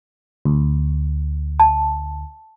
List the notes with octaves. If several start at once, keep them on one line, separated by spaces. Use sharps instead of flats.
D2
A5